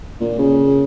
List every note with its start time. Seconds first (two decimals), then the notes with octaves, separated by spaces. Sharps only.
0.21 A#2
0.39 C#3